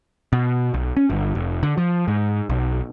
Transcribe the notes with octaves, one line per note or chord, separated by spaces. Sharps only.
B2
B1
C#4
G1
F1
D3
F3
G#2
B1